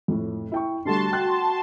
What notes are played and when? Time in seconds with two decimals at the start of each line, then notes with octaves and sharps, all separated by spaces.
0.08 F2 A2
0.52 E4 G5 C#6
0.85 D3 G3 A3 F#4 A5 C6
1.12 G5 F#6